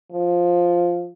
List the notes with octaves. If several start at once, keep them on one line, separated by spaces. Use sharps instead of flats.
F3